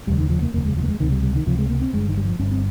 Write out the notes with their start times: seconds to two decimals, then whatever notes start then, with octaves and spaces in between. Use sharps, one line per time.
0.07 F1 D#2 C#3 G3
0.19 D#3
0.30 F3
0.42 A#3
0.54 F1 D#2 C#3 A#3
0.65 G#3
0.77 F3
0.83 A#3
0.89 G#3
1.00 C#2 C3 D#3
1.12 G3
1.23 G3
1.35 D#3
1.46 C#2 C3 F3
1.59 G#3
1.69 A#3
1.82 C4
1.93 G1 G2 G#3
2.08 D#3
2.17 G3
2.25 F3
2.39 G1 G2 C#4
2.52 C4